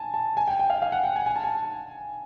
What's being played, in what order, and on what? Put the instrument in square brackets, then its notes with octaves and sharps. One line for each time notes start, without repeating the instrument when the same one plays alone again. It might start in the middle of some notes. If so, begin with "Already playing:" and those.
Already playing: [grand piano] G#5 A5
A5
G#5
G5
G5
F5
F5
F#5
G5
G#5
G#5
A5
G#5